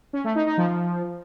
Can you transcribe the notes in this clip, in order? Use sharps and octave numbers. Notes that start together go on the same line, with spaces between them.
C#4
A3
D#4
D#4
F3